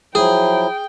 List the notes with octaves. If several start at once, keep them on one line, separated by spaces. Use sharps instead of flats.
F3 F#3 E4 G#4 G5